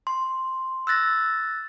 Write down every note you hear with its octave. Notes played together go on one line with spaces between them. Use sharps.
C6
E6 F#6 A6 A#6